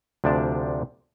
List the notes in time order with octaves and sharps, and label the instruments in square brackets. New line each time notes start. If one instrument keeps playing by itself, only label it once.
[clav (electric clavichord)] D2 C3 F3 D4 D5 A5